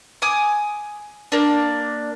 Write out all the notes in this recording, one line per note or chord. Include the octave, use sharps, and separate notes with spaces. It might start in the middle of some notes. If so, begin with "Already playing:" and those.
G#5 D6 D#6
A#3 D4